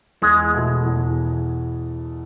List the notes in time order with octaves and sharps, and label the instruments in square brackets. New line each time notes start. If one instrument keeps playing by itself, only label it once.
[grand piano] E2 [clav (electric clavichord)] G#3
[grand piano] B2 A3 E4
E2